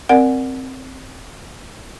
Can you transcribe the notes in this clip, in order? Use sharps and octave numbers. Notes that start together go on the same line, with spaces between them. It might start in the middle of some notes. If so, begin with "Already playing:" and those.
C4 A#4 D5 F#5